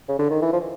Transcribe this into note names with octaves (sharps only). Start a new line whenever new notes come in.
C#3
D3
D#3
E3
F3